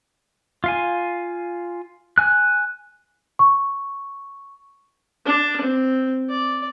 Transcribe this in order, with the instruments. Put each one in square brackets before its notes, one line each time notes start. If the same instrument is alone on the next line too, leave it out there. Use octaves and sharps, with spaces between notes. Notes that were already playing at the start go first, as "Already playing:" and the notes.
[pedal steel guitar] F4 F5 G#5
G#5 F#6
[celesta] C#6
[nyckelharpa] D4
C4
D5